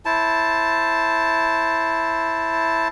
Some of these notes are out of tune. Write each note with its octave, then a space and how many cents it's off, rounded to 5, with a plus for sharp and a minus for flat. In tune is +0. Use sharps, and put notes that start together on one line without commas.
E4 +0 C5 +0 A5 +0